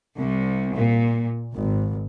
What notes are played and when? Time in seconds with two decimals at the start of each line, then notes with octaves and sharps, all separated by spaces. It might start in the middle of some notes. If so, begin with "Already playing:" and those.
0.18 C2
0.75 A#2
1.54 G#1